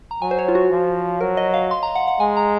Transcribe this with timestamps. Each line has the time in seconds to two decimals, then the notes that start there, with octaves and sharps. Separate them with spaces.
0.11 A#5
0.22 F#3 G#5
0.31 C5
0.39 C#5
0.48 F4
0.55 F#4
0.71 F3
1.21 F#3 A#4
1.37 D#5
1.54 F5
1.71 C6
1.83 A#5
1.95 F#5
2.08 F#5
2.20 G#3 G#5
2.37 A#5